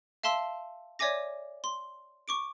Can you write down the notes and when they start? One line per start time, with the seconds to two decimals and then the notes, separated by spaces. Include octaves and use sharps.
0.24 E5 F5 A5 C6 E6
0.99 C#5 D5 E5 G#5 D6 A#6
1.64 C6
2.28 C#6 D6 D7